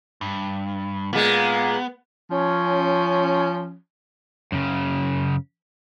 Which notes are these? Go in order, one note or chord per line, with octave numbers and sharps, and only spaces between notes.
G2
A#2 G#3 B3
F3 C#4
F#2 C#3